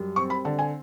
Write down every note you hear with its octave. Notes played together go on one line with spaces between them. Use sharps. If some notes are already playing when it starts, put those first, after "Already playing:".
Already playing: F#2 G3
C4 C#6
B5
D3 A5
G#5